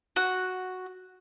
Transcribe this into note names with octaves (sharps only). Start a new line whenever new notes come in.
F#4